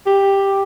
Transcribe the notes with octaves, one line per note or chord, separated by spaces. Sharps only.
G4